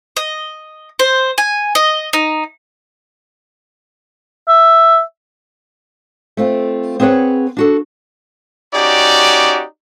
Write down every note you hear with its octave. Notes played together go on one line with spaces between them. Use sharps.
D#5
C5
G#5
D#5
D#4
E5
A3 C4 F4
C4 G#4 B4 C#5 F#5
D4 F#4 A4
C#4 D#4 F#4 G4 D5